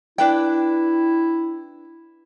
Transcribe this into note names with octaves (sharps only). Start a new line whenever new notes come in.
D4 E4 B4 G5